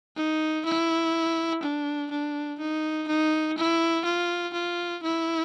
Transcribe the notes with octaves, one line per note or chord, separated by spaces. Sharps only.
D#4
E4
D4
D4
D#4
D#4
E4
F4
F4
E4